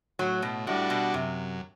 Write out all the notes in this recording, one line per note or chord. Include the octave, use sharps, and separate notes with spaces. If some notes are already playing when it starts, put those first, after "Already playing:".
A2 F#3
B2
A2 G3 D4 F#4
B2
F#2 C3